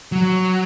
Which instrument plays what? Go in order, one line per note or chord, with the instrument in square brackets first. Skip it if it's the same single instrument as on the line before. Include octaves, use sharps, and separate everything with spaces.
[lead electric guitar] F#3